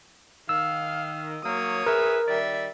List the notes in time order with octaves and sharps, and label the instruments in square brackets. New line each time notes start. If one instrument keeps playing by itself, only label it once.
[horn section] D#3 [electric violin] F5 [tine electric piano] E6
[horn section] F#3 A#3 [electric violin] C#5 D#6
[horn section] G#4 B4 E5 [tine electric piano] A#4
[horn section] D#3 G3 D5 [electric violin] E5